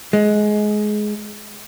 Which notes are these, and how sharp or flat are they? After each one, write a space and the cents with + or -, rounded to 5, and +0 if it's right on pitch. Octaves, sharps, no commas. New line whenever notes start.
G#3 +20